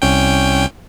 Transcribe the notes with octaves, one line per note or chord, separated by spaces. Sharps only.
C2 C#4 G5